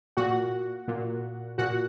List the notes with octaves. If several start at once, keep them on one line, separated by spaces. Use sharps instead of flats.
A#2 F#4 F#5
A#2
A#2 F#4 F#5